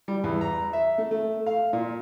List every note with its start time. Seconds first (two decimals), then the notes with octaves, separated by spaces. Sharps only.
0.08 G3
0.24 E2
0.41 A#5
0.73 E5
0.98 A3
1.11 A3
1.46 F5
1.73 A#2